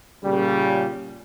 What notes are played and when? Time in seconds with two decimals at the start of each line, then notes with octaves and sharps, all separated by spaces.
0.25 A#2 C#3 G3